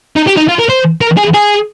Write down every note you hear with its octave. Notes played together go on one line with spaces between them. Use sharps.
D#4
G4
D#4
F4
A#4
C5
A#4
G#4
G#4